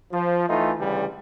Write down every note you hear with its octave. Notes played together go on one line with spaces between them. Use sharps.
F3
E3 A3 D#4 F4
D2 C#3 E3 G3